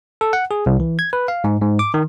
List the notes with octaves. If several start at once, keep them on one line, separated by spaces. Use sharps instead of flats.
A4
F#5
G#4
C2
E3
G#6
B4
F5
G#2
G#2
D6
D#3